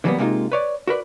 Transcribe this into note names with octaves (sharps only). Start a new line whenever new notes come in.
D3 E3 F#3 G3 A#3 B3
C3 G#3 A#3 D#4 F4
B4 C#5 D5
F#4 A#4 B4 D5